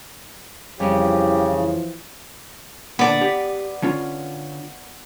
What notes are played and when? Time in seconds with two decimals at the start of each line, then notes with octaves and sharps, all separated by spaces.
0.80 F2 C#3 E3 F3 G3 G4
2.99 A#2 D3 B3 D5 A5
3.21 G4
3.82 D3 C#4 F4